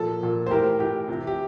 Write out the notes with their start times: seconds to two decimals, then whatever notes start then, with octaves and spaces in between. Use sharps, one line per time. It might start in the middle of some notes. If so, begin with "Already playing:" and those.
Already playing: A#2 F3 A4
0.21 A#2 F3
0.46 C5
0.50 A2 E3 G4 A#4
0.79 A2 E3 G4
1.08 C3 E3
1.27 G4